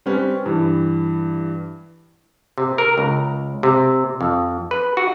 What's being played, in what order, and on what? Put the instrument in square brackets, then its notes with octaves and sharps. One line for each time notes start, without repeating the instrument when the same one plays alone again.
[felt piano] G3 C4 C#4 B4
G2 E3
[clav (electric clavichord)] C3
A#4
C#2
C3
F2
B4
F#4